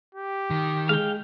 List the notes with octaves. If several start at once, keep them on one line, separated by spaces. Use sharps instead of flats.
G4
D#3
G#3 F5 G5